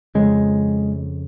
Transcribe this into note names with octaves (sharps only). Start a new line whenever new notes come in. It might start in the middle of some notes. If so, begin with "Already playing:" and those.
F2 C#3 G#3